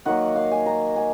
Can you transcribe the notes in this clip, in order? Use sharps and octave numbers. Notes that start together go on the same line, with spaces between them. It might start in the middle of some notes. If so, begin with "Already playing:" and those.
D#3 F#3 A#3 F#5
F5
G#5
A#5
G#5